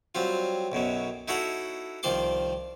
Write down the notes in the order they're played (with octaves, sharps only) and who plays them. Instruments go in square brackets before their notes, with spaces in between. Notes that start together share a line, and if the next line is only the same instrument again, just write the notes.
[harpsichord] F#3 G3 C4 F4
B1 F#2 B2 F#3
D#4 E4 F#4 A4 C#5 F#5
C2 D#3 F3 D5 C6 D6